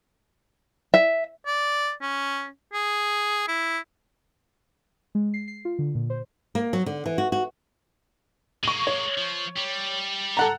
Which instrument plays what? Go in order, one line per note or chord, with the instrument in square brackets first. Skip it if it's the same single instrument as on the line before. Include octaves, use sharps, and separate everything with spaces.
[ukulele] E5
[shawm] D5
C#4
G#4
E4
[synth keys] G#3
C7
C7
F4
D3
A#2
C5
[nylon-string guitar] A#3
F#3
D3
E3
F#4
F#4
[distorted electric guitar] G#3 A#3 [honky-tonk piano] C#6 D#7
[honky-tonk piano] C#5
[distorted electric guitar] F3 C5
G3
[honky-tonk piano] A4 F#5 A#5